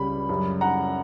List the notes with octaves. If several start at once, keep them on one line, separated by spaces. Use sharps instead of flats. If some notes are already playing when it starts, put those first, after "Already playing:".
Already playing: C#2 C#3 G3 B5
F#2 C#3 G3
F#5 A#5